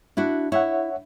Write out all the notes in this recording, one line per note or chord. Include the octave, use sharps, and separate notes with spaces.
D4 E4 F#4
E4 C#5 E5 F#5